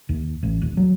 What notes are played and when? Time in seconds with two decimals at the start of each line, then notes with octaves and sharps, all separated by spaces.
0.09 D#2
0.43 A1
0.62 D#1
0.77 F#3